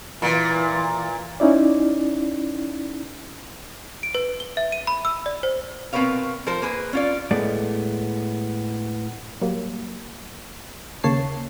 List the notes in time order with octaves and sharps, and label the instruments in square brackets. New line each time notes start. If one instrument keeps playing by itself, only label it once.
[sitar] A#2 [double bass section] E3
[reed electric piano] C#4 D#4 E4 D5
[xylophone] D7
B4
G7
E5
D#7
B5
E6
D5
C5
[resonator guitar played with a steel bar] B2 C4 A#4 B4 C#5 F5
F3 A#4 C5
A#3 G#4 B4
C#4 F4 D5
[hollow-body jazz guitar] A2 G#3 A3 B3 D5
[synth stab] F#3 G3 A#3
D#2 C#3 A#3 C#5 A5 C7